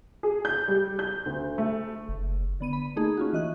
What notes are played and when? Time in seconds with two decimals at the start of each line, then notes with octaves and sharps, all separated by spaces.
0.23 G#4
0.45 G6
0.68 G3
0.99 G6
1.26 D2
1.58 A3
2.09 F#1
2.60 D3 B3 D#7
2.73 B5
2.96 A3 A#3 D#4 G#4
3.17 C#4 F4 F#4
3.33 E3 D#5 F#6